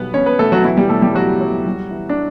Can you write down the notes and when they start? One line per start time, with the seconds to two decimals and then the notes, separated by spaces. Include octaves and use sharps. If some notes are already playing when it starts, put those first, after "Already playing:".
Already playing: B1 G3 B3 B4
0.14 B2 C#4 C#5
0.26 B3 B4
0.39 B2 A3 A4
0.52 F#3 F#4
0.64 E3 F#3 E4
0.77 G3 G4
0.89 B2 A3 A4
1.02 G3 G4
1.14 C#2 F#3 F#4
1.41 F#3
1.67 G3
1.91 E3
2.09 D4